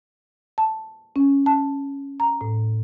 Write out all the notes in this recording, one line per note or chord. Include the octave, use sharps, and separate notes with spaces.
A5
C#4
A5
A#5
A2